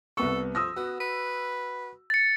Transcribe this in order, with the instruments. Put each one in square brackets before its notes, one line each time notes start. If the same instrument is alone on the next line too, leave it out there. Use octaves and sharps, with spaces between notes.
[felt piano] C2 B3 C#6 [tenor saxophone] A4
[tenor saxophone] F3 [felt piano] D#6 E6 A#6
[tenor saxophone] B3 [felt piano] F#4
[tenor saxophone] B4
[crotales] A6 C#7